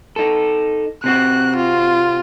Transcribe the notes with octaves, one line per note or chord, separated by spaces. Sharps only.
D#4 A4
C3 C4 F#4 F#6
F4